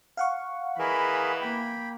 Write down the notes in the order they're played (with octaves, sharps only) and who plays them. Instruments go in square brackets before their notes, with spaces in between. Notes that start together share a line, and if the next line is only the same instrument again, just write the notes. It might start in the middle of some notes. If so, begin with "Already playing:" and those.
[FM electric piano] F5 F#5 C#6
[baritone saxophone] E3 [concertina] G#4 A#4 D#5 [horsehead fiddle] B5
[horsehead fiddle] A#3 [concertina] G5 B5